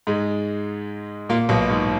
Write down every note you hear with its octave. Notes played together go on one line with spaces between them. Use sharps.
G#2 G#3
A#2 A#3
B1 B2
G#2